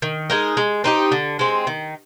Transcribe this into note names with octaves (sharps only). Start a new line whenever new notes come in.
D#3
G#3 D#4 A#4
G#3
C4 D#4 G4
D3
G#3 C4
D#3